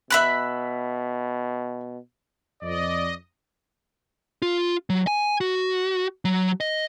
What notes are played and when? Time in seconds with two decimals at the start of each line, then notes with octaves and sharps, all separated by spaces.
0.10 B2 E5 B5 F#6
2.62 F2 D5 D#5
4.42 F4
4.90 F#3
5.07 G#5
5.41 F#4
6.25 F#3
6.61 D#5